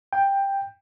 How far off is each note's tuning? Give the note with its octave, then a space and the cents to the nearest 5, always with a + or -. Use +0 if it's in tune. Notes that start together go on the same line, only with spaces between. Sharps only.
G5 +10